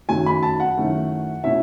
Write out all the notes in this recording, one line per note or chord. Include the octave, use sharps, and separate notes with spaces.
F#2 D#3 F#3 A3 G#5
B5
A5
F#5
F#2 D#3 A3 C#4 E4
B2 A3 C#4 E4 E5